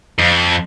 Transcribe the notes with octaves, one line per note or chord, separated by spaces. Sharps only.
F2